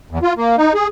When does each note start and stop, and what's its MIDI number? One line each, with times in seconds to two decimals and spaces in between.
0.11 0.19 40
0.22 0.33 65
0.37 0.56 58
0.58 0.73 63
0.74 0.87 68